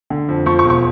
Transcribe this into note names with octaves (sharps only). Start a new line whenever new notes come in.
D3
F2
F3 C#6
C#6
E1
C#6